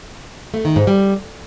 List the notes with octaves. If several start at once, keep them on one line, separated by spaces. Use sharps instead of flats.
A3
D#3
G#2
G3